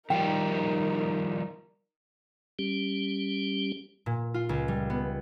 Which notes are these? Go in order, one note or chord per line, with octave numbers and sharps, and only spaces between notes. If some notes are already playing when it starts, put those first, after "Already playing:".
D#3 F3 G3 D#4 A#4 G5
G3 C#4 G4
A#2
F4
C#2
G3
B3